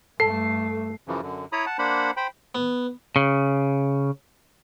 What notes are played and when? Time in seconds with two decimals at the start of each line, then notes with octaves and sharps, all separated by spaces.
0.20 G2 A3 A4 C7
1.08 F#2 C#3 E3 F3
1.23 F#2 D3
1.52 E4 C#5 A#5 B5 D#6
1.66 F#5 A5
1.79 A#3 D4 C5 F#5 B5
2.17 C5 G5 B5
2.55 B3
3.16 C#3